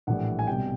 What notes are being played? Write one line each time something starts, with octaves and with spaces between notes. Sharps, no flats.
A#1 A2 E3 G3 F#5
G#5
C2 B2 G3 G5